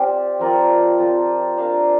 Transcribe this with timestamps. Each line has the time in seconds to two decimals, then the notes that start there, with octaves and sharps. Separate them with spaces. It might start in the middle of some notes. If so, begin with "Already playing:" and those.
Already playing: C4 G4 D5 F5
0.39 F3 C4 A#4 D5
0.98 F3 C4 A#4 D5
1.58 D4 A#4 F5